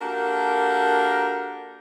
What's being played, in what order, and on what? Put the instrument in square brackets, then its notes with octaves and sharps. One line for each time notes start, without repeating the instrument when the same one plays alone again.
[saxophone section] A#3 D4 F#4 G4 A4 A#4